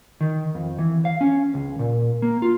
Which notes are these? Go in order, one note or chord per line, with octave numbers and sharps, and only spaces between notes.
D#3
F2
E3
F5
C#4
C#2
A#2
A#3
F4